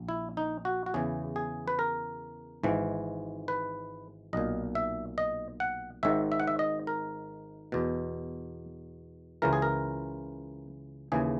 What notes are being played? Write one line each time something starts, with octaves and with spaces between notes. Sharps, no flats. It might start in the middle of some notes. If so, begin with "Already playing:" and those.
Already playing: A#1
E4
D#4
F#4
F#4
E2 C#3 E3 G#4
G#4
B4
A#4
G#1 G#2 E3
B4
B1 A#2 D#5
E5
D#5
F#5
G#1 G#2 D#3 E5
E5
F#5
E5
D#5
A#4
E2 B2
C#2 C#3 E3 A#4
G#4
A#4
D#2 C#3 E3 G#4